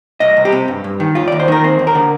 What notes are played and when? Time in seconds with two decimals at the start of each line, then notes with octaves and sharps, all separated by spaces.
0.20 C2 D#5
0.37 C2
0.45 G4
0.52 C3
0.68 G2
0.84 G2
1.00 D#3
1.15 D#2 F4
1.28 D#2 D5
1.40 C5
1.48 D#3 A#4
1.64 C4 C5
1.79 D#2
1.87 A#4
1.95 D3